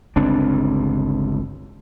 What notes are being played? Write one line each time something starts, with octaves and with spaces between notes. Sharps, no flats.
G1 C#2 C4 D4